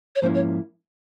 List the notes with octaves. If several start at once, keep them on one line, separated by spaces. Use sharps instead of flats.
C#5
G#2 F3 A#3 C#4 E4 C5
C#5